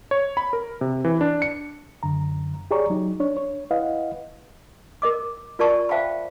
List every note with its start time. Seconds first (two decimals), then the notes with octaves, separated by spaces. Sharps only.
0.11 C#5
0.37 B5
0.53 A#4
0.81 C3
1.05 E3
1.21 D4
1.42 C#7
2.03 F#2 D3 A#5
2.71 G4 G#4 C#5 D5 A#5 C#6
2.90 F#3 D#4
3.20 D4 C#5
3.37 C#5
3.71 E4 B4 D#5 F5 F#5
5.02 A#4 D#5 D6
5.59 F4 A#4 D5 A5 C#6
5.89 C5 E5 F5 G5 A5 B5